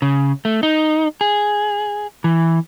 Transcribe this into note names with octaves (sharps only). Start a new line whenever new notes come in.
C#3
A3
D#4
G#4
E3